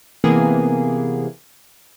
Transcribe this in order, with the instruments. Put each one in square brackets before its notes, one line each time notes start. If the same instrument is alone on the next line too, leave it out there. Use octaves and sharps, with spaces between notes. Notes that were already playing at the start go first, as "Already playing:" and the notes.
[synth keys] C3 E3 A#3 B3 G#4